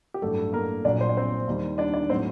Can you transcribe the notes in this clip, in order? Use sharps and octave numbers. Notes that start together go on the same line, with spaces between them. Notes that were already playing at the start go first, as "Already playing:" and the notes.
G4
A1 G2 F#3 A3 A4
A#3 A#4
A#1 A#2 F#3 D4 D5
C5
D5
C4 C5
D#2 D#3 G3
D4 D5
D4 D5
A2 F#3 C4 C5